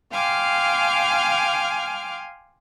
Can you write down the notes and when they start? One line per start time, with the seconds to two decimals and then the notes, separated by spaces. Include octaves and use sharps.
0.12 F5 G5 G#5 C6 D6 F6